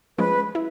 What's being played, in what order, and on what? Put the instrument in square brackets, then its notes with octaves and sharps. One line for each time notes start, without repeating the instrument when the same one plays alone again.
[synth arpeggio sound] F3 G#3 C#4 [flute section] B4
[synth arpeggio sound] E4